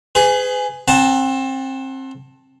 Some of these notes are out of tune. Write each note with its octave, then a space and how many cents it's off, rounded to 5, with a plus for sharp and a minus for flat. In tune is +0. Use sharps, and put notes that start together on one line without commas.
G#4 +0 B4 +40
C4 +25 F#5 +0 A5 +0